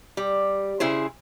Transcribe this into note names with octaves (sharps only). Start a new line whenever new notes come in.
G3
C#3 E4 G#4 C5